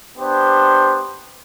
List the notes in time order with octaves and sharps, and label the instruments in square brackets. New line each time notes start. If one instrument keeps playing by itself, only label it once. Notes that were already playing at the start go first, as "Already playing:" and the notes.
[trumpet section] B3 D4 G4 C5